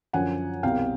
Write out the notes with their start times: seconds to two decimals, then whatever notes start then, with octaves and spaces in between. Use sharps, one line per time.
0.13 F#2 D3 F3 F#5 G#5
0.63 C2 B2 F5 G5